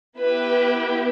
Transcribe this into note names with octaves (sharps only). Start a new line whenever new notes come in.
B3 E4 G4 B4